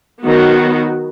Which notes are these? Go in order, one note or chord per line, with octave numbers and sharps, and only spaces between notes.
D#3 F#3 B3 F#4